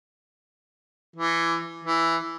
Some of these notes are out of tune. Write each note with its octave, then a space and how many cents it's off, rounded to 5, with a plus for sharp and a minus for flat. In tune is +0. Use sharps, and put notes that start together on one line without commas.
E3 +20
E3 +5